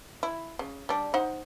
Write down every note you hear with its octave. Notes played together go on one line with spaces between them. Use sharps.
E4
C#3
G3 D4
D#4 C5 F#5